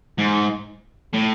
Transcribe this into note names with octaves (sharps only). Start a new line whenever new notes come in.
G#2
A2